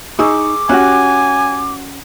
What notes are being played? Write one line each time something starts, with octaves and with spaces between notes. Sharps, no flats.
D#4 G#4 C#6 D6 E6
C#4 E4 F#4 G4 G#5 F#6